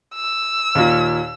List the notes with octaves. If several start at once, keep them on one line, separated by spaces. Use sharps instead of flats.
E6
D#2 A#2